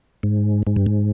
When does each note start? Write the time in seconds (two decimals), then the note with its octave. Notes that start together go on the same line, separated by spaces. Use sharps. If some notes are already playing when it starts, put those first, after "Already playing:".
0.23 G#2
0.67 G#2
0.76 G2
0.86 G#2